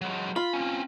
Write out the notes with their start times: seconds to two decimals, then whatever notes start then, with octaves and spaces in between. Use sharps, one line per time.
0.01 F#3 G#3
0.36 F4 B5
0.53 C4 C#4